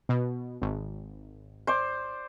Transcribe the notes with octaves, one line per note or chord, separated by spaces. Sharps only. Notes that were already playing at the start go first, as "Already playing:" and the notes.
B2
G#1
C5 D5 D6